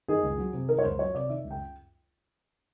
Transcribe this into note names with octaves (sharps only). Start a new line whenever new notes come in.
D#3 G#4
C#2
F#3
C3
D#3 A#4
C#5
C#2 C5
F#3 C#5
C3 D5
D#3 E5
C#2
G5